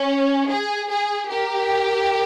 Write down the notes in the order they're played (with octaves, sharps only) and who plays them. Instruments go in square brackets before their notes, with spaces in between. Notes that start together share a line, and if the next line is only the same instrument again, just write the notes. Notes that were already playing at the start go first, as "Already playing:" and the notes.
Already playing: [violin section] C#4
G#4
G#4
G4 A#4